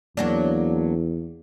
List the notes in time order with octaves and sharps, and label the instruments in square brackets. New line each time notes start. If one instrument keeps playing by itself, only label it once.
[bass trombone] E2 [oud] F#3 A#3 D4